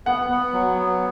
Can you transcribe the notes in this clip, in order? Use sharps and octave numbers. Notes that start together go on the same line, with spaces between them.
B3 F#5
B3
F#3
B3